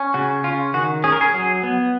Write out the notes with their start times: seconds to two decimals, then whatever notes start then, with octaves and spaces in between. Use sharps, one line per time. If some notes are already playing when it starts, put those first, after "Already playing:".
Already playing: C#4
0.14 C#3 F#4
0.44 C#4 F4
0.74 D#3 F#4
1.04 C#4 G#4
1.12 A#4
1.21 G#4
1.34 F#3
1.63 B3